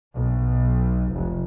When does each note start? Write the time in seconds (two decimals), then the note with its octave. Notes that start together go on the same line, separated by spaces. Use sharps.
0.16 B1
1.13 F1